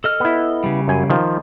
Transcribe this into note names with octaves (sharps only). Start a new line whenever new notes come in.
A4 D#5 F6
B3 E4
C#3 G3
F#2 G#5
D#3 F3